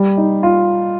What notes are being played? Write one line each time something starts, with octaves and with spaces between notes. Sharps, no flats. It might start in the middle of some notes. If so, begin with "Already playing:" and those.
Already playing: G3
D#4
F4